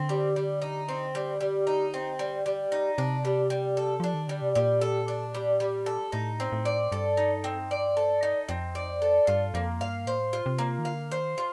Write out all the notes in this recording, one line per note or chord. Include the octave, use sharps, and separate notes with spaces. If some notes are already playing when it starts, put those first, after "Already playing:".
Already playing: D3 C4
G3
G3
D#4
C4
G3
G3
D#4
C4
G3
G3
D#4
C3 D4
G3
G3
A4
F3 D4
D#3
D3 G3
C3
A#2 G3
A4
D4
G3
G3
A4
A2 D#4
C4
A2
D5
G2 A4
D#4
C4
D5
A4
D#4
F2 C4
D5
A4
G2 F4
F2 A#3
G2 F5
A2 C5
F4
C3
A#3
D#3
D3 F5
D#3 C5
F4